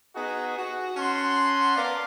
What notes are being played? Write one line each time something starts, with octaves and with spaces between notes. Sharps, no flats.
B3 D#4 F#4 G#4
F#4
C#4 F#5 A5 C6
B3 A#4 D5 F5